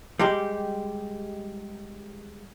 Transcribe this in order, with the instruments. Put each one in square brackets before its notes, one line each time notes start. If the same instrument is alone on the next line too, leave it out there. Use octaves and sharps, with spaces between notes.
[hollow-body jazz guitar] G3 G#3 G4